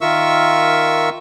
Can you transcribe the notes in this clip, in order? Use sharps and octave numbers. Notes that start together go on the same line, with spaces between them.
D#3 F4 A#4 E5 C#6 E6